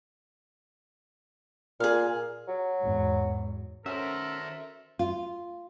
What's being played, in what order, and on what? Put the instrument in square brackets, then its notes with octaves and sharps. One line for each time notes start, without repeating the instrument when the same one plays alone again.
[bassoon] A#2 [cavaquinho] G#4 F5
[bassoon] F#3
[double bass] E2 G#2
[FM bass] C#4 [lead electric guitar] F#4 C5 [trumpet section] A4 A#4 [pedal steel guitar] E5
[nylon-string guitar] F4